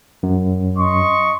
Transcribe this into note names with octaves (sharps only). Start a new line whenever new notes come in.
F#2
D#5 C6 C#6